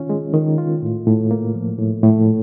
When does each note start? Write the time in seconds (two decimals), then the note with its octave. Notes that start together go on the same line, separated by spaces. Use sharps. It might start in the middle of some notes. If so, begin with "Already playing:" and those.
Already playing: D#3 C#4 F4
0.10 G#3
0.34 D#3
0.58 F4
0.82 A2
1.07 A2
1.31 A#3
1.55 F3
1.79 A2
2.03 A2
2.27 A#2